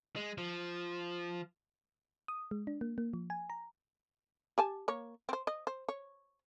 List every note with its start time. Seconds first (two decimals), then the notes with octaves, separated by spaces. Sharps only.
0.16 G#3
0.38 F3
2.28 D#6
2.51 G#3
2.67 D4
2.81 A#3
2.98 A#3
3.14 F3
3.30 G#5
3.50 A#5
4.58 G4 G#5 A5
4.88 A#3 C#5
5.29 C4 C5
5.47 D#5
5.67 C5
5.89 C#5